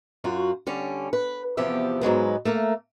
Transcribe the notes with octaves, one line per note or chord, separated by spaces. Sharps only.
F#2 F4 F#4
D3 G3 C#4
B4
E2 C3 F3 B3 G4 E5
G#2 F#3 G#3 B3
A3 A#3 A#4